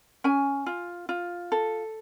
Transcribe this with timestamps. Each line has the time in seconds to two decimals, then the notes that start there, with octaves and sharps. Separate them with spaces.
0.24 C#4 G#5
0.66 F4
1.09 F4
1.52 A4